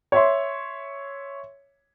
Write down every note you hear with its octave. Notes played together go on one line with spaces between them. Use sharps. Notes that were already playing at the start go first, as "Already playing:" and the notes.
C#5 E5 C6